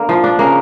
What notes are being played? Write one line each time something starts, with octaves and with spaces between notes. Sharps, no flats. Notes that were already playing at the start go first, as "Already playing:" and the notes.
Already playing: D3 A#3
F3
D4
C#3 A#3